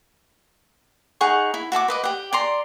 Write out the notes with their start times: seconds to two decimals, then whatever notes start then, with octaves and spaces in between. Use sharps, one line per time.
1.21 D#4 G#4 F#5 C#6
1.54 E4
1.72 F#4 E5 A5 D6
1.88 B4 D#5 D6
2.04 G4 F#5
2.33 D5 A#5 C6